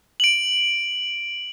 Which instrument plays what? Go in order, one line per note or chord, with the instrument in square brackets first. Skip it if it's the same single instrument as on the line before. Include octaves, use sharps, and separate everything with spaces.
[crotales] D7 F#7